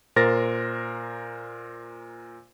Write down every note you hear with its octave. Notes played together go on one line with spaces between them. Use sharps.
A#2 A#4 C5 A6 A#6